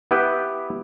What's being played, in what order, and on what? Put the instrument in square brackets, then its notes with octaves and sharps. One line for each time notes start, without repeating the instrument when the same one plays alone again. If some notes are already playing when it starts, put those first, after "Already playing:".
[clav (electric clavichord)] B3 E4 G4 B4 G5